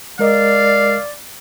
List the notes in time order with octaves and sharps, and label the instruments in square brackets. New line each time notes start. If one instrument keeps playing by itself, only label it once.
[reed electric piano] G#3 A#4 D#5 [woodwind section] D5 [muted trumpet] F5